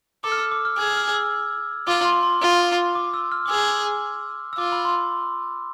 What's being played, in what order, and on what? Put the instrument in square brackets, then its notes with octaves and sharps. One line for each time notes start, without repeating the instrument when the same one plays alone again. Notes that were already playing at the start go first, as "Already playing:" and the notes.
[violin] A4 [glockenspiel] D6
[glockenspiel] F6
E6
D6
F6
[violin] G#4 [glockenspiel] G#6
[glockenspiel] F6
E6
[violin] F4 [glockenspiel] D6
[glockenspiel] C6
C6
[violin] F4
[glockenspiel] D6
E6
F6
D6
[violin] G#4 [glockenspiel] E6
[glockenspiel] E6
[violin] F4 [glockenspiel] D6
[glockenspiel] B5
C6